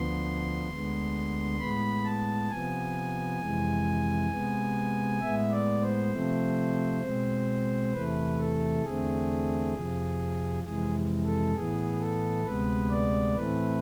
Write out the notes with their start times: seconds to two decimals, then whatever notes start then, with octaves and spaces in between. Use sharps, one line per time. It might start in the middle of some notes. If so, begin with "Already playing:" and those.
Already playing: D2 D3 F3 B3 C6
0.69 D2 D3 G#3 B3
1.60 A2 G#3 B3 B5
2.04 A5
2.50 C3 F3 B3 G#5
3.40 F2 C3 E3 G#3
4.31 C3 G#3 B3
5.21 A2 G#3 B3 E5
5.52 D5
5.81 C5
6.12 C3 F3 A3 C4
7.03 B2 G#3 C4
7.93 E2 C3 E3 A3 B4
8.38 A4
8.83 E2 D3 A3 C4 G#4
9.73 F2 C3 F3
10.64 F2 C3 E3 G#3 G#4
11.25 A4
11.54 A2 E3 B3 G#4
12.00 A4
12.44 D2 C3 G#3 B3 B4
12.90 D5
13.35 A2 E3 A3 C4 B4